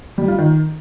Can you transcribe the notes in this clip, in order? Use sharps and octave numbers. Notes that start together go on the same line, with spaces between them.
G3
F4
D#3